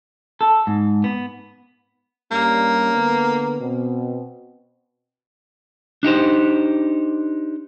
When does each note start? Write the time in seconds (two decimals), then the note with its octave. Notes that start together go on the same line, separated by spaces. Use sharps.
0.41 A4
0.67 G#2
1.04 B3
2.31 G2 G3 A#3 C#4
2.93 D3 B3
3.60 B2 C4
6.03 D4 D#4 G4 C5